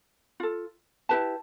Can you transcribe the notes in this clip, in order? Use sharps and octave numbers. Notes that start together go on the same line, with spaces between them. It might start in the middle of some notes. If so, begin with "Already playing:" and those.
F4 A4
E4 G4 B4 A5